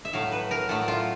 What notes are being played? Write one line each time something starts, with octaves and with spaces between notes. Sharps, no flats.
E5
A2 F#3 A3 F5
B4
A#4
A2 F#3 A3 A4
F4